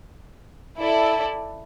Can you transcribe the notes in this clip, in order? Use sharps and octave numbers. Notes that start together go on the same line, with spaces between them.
E4 A4 D5